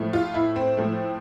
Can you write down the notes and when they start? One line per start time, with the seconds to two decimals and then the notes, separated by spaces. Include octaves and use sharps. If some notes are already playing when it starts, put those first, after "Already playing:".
Already playing: A2 F3 A3
0.13 F4
0.34 E4
0.56 C4
0.77 A2 F3 A3